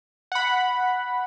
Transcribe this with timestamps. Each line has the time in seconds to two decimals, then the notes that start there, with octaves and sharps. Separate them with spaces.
0.32 F#5 B5